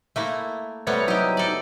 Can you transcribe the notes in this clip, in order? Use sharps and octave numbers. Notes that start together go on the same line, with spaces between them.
A3 A#3 E4
C3 G3 A3 B3 C#5
F#3 D#4 E4 G4
A4 D5